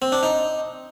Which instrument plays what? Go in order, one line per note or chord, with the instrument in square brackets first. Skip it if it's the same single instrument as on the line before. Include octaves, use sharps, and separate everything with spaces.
[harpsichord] C4
D4
D#4